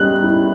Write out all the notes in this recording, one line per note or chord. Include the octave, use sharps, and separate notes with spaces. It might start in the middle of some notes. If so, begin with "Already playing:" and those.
Already playing: G3 C#4 F#6
E4